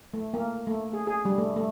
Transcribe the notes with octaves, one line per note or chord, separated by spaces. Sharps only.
A3
A#3
A3
G#4
G#4
G3
A3
A3